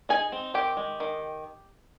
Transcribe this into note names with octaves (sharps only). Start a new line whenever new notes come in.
D#4 G#4 G#5
C4
D#3 G4 G5
G#3
D#3